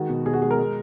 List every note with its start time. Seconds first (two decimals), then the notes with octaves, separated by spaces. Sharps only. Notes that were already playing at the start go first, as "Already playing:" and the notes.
Already playing: D#3 G#3 F#4
0.09 B2
0.26 B2 G#4
0.33 F#4
0.42 G#3 G#4
0.51 A#4
0.59 G#3